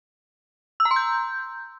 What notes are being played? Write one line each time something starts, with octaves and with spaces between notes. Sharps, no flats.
E6
A#5
C6
G6